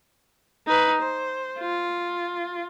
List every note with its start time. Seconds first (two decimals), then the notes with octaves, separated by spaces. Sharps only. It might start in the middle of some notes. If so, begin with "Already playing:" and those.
0.67 D#4 B4
1.01 C5
1.60 F4